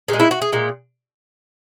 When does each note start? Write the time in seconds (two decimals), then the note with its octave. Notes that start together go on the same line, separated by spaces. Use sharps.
0.08 A#2 G#3 G#4
0.20 E4
0.31 F#4
0.42 G#4
0.52 A#2 G#3